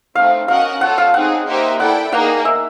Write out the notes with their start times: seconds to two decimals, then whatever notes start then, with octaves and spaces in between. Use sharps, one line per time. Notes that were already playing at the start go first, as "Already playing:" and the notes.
0.15 A3 C4 D#4 F5
0.48 C#4 F#4 A#4 D#5 F5 F#5
0.81 F4 A4 C#5 F#5
0.98 F5
1.14 C4 D#4 G#4 F#5
1.47 A#3 D#4 G4 C5 E5
1.79 E4 A4 D5 F#5 G5
2.12 A#3 D#4 G#4 F#5
2.45 E5